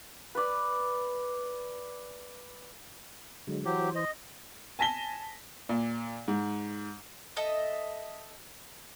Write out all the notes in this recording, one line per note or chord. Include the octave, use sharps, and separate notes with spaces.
B4 D5
D3 F#3 G#3
E3 F#3 G4 C5
D#5
G#5 A5 A#6 B6 G7
A#2
G#2
A4 D#5 E5